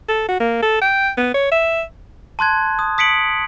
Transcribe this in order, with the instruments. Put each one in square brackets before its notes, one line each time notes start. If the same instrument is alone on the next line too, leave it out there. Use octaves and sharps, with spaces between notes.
[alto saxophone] A4
F#4
A#3
A4
G5
B3
C#5
E5
[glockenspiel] A5 C6 F#6 G#6
D#6
D#6 B6 C#7 D7 F#7